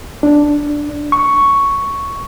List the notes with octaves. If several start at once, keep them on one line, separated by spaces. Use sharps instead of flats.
D4
C#6